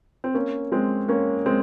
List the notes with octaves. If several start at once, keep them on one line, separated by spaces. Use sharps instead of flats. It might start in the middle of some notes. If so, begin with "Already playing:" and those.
C4
A#3 C#4
G#3 C4
A#3 C#4
G#3 C4